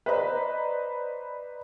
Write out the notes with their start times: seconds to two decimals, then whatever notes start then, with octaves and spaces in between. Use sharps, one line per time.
0.06 B4 C5 D5 D#5 A#5